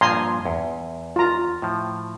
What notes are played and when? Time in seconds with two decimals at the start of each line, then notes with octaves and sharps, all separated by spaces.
0.01 G2 A#2 F3 G#5 A#5 C6
0.46 E2
1.16 F4 A#5
1.62 A2 F3